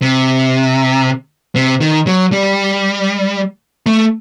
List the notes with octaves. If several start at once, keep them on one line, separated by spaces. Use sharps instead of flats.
C3
C3
D#3
F#3
G3
A3